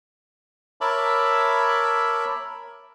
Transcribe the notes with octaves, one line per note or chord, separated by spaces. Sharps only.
A#4 C#5 E5 A5 B5 D6